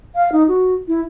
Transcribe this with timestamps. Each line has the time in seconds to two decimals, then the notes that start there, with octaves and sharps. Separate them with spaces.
0.15 F5
0.32 D#4
0.48 F#4
0.88 E4